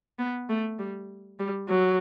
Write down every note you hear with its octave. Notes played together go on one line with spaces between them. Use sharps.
B3
A3
G3
G3
F#3